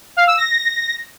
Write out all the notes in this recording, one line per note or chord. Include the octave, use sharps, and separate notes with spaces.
F5
E6
A#6